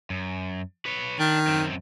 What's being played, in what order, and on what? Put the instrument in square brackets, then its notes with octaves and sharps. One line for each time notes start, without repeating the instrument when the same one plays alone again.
[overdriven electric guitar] F#2
B4 C#5
[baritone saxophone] D#3 [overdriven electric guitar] D4
[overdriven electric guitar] F#2 C4